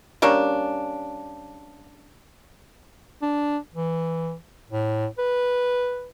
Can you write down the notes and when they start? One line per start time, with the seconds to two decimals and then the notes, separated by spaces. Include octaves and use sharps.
0.22 G3 A#3 C#4 D4
3.22 D4
3.75 E3
4.71 A2
5.19 B4